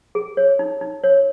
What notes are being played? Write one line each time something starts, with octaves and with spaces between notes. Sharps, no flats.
G#4
C#5
D#4
D#4
C#5